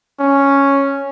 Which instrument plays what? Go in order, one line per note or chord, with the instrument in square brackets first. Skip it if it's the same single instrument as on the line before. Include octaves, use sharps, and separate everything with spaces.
[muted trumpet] C#4